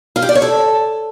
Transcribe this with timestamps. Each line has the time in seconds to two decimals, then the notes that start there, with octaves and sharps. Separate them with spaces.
0.16 F4
0.22 G4
0.29 D5
0.35 C#5
0.42 A4